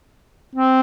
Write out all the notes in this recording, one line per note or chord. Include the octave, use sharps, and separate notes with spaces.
C4